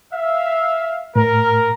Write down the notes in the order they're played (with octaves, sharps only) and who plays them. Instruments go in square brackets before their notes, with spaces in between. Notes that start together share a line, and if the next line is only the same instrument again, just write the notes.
[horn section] E5 F5
[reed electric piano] A2 [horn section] A#4